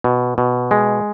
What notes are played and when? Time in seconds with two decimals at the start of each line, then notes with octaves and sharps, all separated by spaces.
0.04 B2
0.38 B2
0.71 G#3